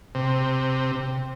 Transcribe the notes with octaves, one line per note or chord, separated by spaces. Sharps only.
C3